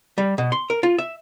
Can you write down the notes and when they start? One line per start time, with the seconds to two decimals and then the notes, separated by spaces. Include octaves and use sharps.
0.18 G3
0.38 B2
0.52 C6
0.70 A#4
0.83 F4
0.98 E5